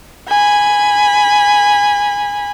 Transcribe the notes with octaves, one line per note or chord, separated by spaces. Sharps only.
G#5 B5